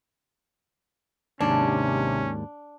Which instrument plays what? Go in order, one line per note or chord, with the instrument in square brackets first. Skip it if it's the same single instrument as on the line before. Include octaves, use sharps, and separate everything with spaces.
[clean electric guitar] D#2 G#2 [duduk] C3 [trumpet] C#4 [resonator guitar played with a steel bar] D4